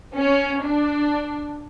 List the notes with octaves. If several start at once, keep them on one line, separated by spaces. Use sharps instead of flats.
C#4
D4